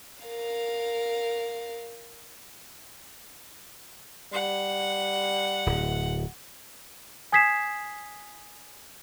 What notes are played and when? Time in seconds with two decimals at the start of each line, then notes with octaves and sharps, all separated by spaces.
0.23 A#4 F5
4.33 G3 F#5
5.66 D1
7.32 G#5 D#6 G#6 B6 C7 E7